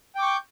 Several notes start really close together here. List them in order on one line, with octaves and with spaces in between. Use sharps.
G5 D6 C#6 G6